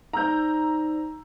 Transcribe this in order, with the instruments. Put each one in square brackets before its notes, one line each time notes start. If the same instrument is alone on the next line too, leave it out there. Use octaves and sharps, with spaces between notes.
[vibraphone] D#4 C5 D5 [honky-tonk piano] A#5 E6 G6